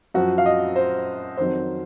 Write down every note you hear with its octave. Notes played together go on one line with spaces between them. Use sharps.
F#2 F3 F#4
F5
D#5
C5
F2 D#3 F#3 C5